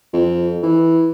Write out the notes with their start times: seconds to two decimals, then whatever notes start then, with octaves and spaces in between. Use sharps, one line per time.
0.13 F2
0.63 E3